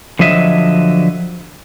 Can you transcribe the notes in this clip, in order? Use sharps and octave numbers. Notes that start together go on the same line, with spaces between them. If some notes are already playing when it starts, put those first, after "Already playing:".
D3 F3 F#3 D#5 E5